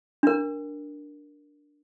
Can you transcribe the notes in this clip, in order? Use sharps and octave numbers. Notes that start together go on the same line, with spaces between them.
D4 A#4